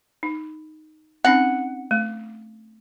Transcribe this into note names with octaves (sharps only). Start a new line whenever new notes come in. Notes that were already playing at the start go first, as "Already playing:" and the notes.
D#4
C4 C#4 D#4 F#5
A3